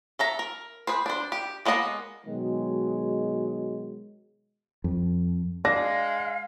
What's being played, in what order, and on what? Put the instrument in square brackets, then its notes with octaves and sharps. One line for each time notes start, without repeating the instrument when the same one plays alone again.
[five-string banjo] A4 E5 A#5
A#4
G#4 B4 C5
D4 C5
G4
G#3 A#3 B3 D#5 F#5
[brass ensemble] B2 D#3 F#3 G#3
[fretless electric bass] F2
[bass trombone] G#3 [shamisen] D4 [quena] F5 [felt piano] A#6